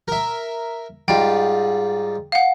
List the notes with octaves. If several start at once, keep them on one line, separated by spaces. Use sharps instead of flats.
A#4 E5
G#2 G3 F4 G5
F5 F#5